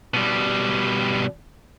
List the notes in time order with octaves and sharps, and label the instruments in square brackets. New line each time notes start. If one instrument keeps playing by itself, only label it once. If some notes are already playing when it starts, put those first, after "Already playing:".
[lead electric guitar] B2 G3